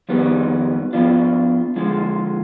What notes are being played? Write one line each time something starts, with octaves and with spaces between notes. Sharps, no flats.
F2 D#3 G3 B3
F3 B3 D4 F4
D3 F3 G#3